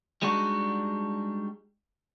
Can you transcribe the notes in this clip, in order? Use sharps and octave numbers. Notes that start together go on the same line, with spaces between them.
G3 G#3 D4 D#4 F#4